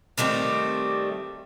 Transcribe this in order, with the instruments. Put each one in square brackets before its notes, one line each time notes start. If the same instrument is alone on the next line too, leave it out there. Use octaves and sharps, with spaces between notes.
[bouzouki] D#3 G3 A3 C4